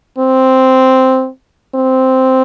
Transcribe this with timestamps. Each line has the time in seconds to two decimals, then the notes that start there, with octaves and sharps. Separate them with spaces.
0.18 C4
1.75 C4